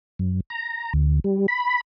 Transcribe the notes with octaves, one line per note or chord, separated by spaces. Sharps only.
F#2
A#5
D2
G3
B5